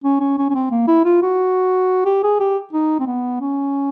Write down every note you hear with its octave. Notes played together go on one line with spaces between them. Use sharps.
C#4
C#4
C#4
C#4
C4
A#3
E4
F4
F#4
G4
G#4
G4
D#4
C4
B3
C#4